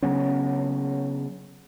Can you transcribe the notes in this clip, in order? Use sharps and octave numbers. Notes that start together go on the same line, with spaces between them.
C#3 F#3 B3 C#4